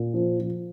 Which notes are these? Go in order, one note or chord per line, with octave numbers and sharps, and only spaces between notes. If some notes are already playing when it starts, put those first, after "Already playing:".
Already playing: A#2
F3
F3